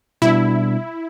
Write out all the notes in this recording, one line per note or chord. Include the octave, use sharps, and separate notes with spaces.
B2 G3 B3 D4 E4